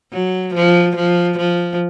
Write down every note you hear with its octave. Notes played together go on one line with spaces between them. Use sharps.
F#3
F3
F3
F3